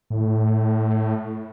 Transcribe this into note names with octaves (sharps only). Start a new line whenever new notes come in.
A2